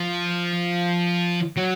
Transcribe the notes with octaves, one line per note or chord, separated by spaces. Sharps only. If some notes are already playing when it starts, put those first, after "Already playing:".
Already playing: F3
F#3